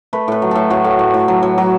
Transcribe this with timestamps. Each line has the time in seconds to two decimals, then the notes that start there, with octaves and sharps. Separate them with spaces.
0.13 A3 B4
0.28 A2 B4
0.42 F#3
0.51 A2 A4
0.70 A2 F#4
0.84 A2
0.99 A2
1.14 A2
1.28 F#3
1.43 F#3
1.58 F#3